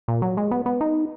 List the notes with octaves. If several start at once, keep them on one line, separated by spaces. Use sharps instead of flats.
A#2
F#3
G#3
B3
B3
D#4